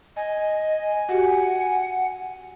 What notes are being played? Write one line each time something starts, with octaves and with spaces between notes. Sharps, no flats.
D#5 G#5
F#4 G4 F#5